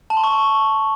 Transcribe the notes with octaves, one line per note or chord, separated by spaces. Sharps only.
A5
C6
C#6